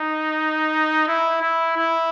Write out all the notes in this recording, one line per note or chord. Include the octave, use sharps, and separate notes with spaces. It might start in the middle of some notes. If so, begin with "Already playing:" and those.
Already playing: D#4
E4
E4
E4